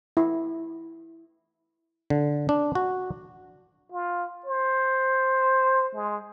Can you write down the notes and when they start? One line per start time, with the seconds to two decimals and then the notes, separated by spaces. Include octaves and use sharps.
0.17 E4
2.10 D3
2.49 D4
2.75 F#4
3.92 F4
4.46 C5
5.95 G#3